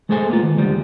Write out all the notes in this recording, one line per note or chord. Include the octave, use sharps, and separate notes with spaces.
G#3 A3 G#4 A4 C5 G#5
A#3 B3 F4
D#3
D2 D3 F3 G3 G#3